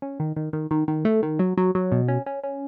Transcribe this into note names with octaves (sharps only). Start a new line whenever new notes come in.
C#4
D#3
D#3
D#3
D#3
D#3
A3
D#3
F#3
F#3
F#3
B2
C#4
C#4
C#4